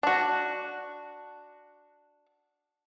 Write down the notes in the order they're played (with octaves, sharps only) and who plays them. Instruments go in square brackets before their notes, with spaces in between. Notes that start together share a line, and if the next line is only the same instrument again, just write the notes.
[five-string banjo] D4 F#4